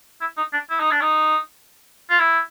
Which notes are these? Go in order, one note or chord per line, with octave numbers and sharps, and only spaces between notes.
E4
D#4
D4
E4
D#4
D4
D#4
F4
E4